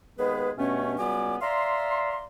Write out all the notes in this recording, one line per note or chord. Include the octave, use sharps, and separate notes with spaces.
D#2 G#3 B3 G#4 B4
G2 B2 A3 B3 C#4
C#2 G3 B3 F#4 G#5 D6
D5 E5 F5 A#5 C6